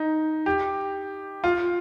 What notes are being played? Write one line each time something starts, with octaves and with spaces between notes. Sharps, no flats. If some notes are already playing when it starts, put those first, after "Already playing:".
Already playing: D#4
G4
F4